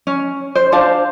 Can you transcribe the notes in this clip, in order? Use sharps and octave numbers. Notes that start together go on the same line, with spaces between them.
C#4
C5
D4 C5 F5 A5